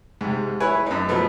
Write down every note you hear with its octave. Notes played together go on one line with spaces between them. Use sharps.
G#2 C3
E4 B4 C#5 G#5
F#2 D#4
B2 F3 F#3 A3 B3